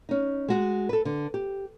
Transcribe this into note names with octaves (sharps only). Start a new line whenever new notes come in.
C#4 D#4
G#3 F#4 G#4
A4 B4
D3
G4